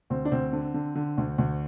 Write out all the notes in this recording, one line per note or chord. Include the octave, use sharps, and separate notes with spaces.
D2 C4
D4
D2 C4
D3
D3
D3
D2
D2